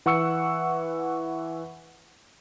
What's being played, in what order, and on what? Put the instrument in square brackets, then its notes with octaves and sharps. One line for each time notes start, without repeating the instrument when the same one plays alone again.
[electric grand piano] E3 F#5 C#6 E6 C#7